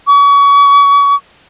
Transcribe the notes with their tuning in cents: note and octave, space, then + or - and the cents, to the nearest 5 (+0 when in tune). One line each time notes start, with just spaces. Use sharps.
C#6 +35